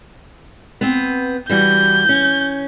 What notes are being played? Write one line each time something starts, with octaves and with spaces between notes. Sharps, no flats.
B3 C4
E3 G3 F#4 G6
C#4